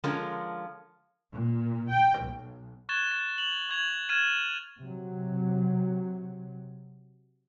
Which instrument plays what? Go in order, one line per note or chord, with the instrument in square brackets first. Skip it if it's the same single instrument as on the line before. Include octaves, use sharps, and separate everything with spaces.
[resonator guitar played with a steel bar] D3 F3 G#3 C#4 F4 A#4
[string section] A#2
G5
B1
[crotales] C#6 F#6 G#6 A6 E7 G7
C#6 A6 E7
F7 F#7
C#6 G#6 F7 F#7
F6 G#6 A6 D#7 E7
[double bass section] C3 F#3